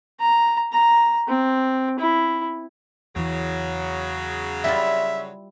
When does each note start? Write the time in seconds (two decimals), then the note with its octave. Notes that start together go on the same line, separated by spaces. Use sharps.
0.20 A#5
0.72 A#5
1.28 C4
1.99 E4
3.16 E2 C#3 E3 F#3
4.64 G3 E4 F4 E5